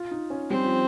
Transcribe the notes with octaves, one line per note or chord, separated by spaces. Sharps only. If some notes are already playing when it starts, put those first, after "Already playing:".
Already playing: F4
D#4
C#4
G3 C4
F3